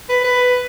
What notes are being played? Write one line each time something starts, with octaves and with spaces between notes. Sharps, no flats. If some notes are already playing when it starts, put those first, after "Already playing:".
B4
B4